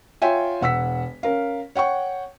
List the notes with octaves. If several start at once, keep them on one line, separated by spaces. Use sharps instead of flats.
F4 C#5 E5 G5 G#5
E1 F#5 E6 B6
C#4 A#4 F5
C#5 F#5 G5 C#6